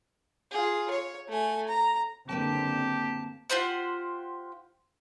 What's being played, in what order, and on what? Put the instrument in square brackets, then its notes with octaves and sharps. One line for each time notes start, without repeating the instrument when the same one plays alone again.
[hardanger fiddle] F4 G#4
C#5
A3 G#5
A#5
[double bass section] F#1 D3 C4 [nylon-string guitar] A#3 B4 G5 [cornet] G4 [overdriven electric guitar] A5
[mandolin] F4 G4 C5 F#5